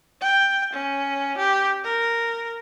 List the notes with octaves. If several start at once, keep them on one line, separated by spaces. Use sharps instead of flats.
G5
C#4
G4
A#4